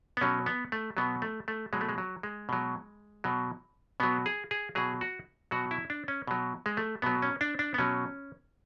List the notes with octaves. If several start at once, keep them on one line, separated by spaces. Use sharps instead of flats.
B3
B2 F#3 C#4
B3
A3
B2 F#3 B3
A3
A3
B2 F#3 G#3
A3
G#3
F#3
G#3
B2 F#3
B2 F#3
B2 F#3 B3
G#4
G#4
B2 F#3 G#4
F#4
B2 F#3 F#4
E4
D4
C#4
B2 F#3
G#3
A3
B2 F#3 B3
C#4
D4
D4
B3
B2 F#3 C#4